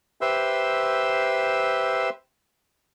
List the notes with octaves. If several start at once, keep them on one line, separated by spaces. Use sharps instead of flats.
G4 B4 C5 E5 C6 E6